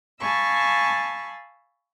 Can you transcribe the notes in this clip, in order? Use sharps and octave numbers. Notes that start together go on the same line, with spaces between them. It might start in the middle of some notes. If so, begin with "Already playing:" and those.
F5 G#5 A5 B5 C#6 E6